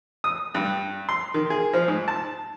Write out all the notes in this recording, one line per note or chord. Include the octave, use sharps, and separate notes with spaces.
D#6
G2
C6
D#3
G#4
F3
G#2
A5